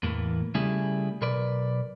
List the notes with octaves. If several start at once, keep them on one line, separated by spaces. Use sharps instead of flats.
E2 A2 E3 A#3
C#3 G3 A3 E4 G#4
B1 A#4 B4 D5